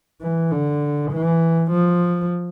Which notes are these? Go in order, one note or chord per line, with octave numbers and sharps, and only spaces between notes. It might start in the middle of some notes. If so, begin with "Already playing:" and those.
E3
D3
E3
F3